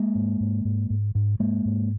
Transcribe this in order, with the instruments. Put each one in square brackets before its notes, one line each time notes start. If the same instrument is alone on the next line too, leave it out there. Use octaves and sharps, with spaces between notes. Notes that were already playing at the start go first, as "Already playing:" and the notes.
Already playing: [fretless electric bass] G#3 A#3
G#2
G#2
G#2
G#2
G#2
G#2 G#3 A#3
G#2